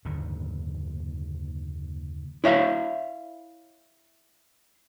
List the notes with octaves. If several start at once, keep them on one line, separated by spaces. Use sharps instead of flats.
F#1 D#2 G#2 D3
E4 C#5 E5 F5